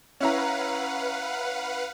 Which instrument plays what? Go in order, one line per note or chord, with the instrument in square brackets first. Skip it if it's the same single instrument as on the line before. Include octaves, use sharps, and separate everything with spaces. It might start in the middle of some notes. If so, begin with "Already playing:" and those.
[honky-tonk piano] C#4 E4 A#5 [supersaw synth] B4 F5 F#5